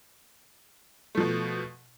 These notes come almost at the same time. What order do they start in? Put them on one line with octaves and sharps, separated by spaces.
A3 F3 B2